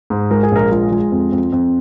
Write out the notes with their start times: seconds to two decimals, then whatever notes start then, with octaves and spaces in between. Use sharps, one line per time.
0.10 G#2
0.31 G#3 A#4
0.43 G#4
0.52 A#1 A#4
0.71 G#3 F4
0.92 G#3
1.12 F2
1.32 F2
1.52 F2